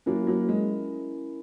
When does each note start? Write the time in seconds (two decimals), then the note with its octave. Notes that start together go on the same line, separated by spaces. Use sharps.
0.06 F#3 A#3 C#4 E4 A#4
0.27 F#3 A#3
0.49 G#3